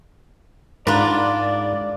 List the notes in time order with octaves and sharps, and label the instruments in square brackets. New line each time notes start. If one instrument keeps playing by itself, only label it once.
[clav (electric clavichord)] G#2 [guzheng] D4 F4 [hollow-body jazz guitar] A#4 B5 [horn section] D5